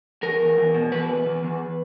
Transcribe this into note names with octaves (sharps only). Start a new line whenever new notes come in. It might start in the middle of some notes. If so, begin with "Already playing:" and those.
E2 A#4
E2
E2
B2
E2 B4
E2
E2
E2